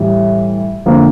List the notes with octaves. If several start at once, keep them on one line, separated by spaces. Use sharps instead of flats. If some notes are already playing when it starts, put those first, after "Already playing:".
Already playing: A2 E3 G3
F2 D3 F3 A#3